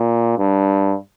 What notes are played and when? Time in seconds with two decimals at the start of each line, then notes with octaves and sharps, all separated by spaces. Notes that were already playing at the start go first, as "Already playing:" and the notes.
Already playing: A#2
0.38 G2